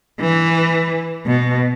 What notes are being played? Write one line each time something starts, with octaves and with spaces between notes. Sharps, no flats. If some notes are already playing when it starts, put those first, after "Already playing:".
E3
B2